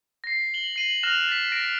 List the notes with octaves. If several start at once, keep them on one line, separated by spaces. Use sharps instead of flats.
A#6 C7
F#7 G7
C7 D#7 F#7
F6 F#6 A#6 E7 F7
A6 B6
A#6 D7